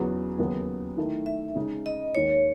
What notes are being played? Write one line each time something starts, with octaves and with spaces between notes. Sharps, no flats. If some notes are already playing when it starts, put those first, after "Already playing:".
Already playing: E2 C#3 F#3 B3 F#4
D#2 C#3 F#3 B3
D#3 A3 E4 A4
E5
C#3 G#3 D#4 G#4
D#5
D#2 D#3 G#3 C#5